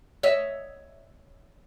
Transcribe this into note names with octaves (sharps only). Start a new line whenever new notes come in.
C#5 D#5 E5